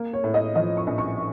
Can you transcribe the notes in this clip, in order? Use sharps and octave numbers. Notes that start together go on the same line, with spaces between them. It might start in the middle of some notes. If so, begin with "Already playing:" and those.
Already playing: A#3
C#5
A2
D#5
F3 D#5
C#6
A#1
C#6